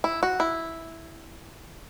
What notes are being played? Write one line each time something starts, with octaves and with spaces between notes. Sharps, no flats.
E4
F#4
E4